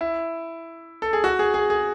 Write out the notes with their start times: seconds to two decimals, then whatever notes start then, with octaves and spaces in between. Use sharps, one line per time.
0.01 E4
1.02 A4
1.13 G#4
1.24 F#4
1.39 G#4
1.54 G#4
1.70 G#4